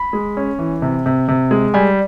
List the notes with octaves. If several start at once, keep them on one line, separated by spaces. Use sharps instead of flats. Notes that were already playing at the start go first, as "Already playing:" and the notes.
Already playing: B5
G#3
C#4
E3
C3
C3
C3
G#3
G3 G#5